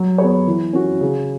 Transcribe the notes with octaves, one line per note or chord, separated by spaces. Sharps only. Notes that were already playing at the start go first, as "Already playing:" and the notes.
Already playing: F#3
B3 G#4 C#5
E3
C#4 F#4
C#3